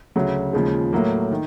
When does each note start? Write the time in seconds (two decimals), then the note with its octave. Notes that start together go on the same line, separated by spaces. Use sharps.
0.16 D2 C#3 F#3
0.53 D#2 C#3 F3 G#3
0.93 A2 F#3 A#3
1.31 D#3